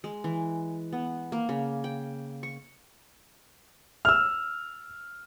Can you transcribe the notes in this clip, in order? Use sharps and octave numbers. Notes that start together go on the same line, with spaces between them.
G#3
E3
B3
A#3
C#3
G5
C#6
E6 F6